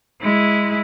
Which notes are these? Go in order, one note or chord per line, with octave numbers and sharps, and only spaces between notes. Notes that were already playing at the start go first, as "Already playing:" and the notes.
G#3 E4